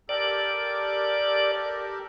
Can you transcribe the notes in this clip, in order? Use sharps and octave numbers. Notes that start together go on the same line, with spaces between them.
G4 A4 A#4 D5